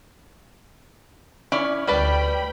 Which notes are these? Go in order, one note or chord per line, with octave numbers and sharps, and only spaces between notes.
C#4 E4 D5
D2 G3 B4 G5 A5 B5